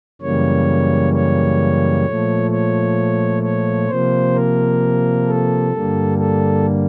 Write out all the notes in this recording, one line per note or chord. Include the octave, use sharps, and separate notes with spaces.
F#2 C#3 E3 G3 A#3 C#5
C#5
A#2 F3 A3
C#5
C#5
C3 F3 A#3 C5
A#4
A4
G2 D3 G3 A#3
A4